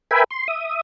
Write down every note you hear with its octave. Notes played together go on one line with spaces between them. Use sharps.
A#4 B4 E5 G5 G#5 B5
C6
E5 D#6